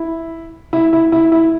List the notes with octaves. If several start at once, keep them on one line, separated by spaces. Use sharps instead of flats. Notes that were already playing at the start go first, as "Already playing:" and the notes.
Already playing: E4
E4
E4
E4
E4